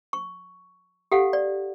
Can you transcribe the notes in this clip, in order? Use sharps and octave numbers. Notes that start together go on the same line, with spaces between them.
C#6
G4 A4 F5 F#5
D5